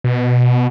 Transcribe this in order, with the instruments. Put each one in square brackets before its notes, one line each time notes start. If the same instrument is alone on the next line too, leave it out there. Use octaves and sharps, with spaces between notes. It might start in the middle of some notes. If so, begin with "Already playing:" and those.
[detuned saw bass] B2